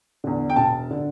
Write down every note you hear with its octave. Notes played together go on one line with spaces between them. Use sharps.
E2 D3
G5
E1 A5
D3